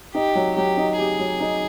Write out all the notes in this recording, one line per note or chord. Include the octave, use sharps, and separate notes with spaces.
D#4 G4
F#3
F#3 G4
D#4
G4 G#4
F#3
D#4